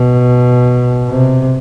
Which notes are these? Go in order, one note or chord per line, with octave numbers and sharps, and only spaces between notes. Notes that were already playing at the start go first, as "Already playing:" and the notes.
Already playing: B2
C3